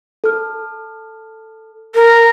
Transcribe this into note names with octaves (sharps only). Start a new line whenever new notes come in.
A4 F6
A#4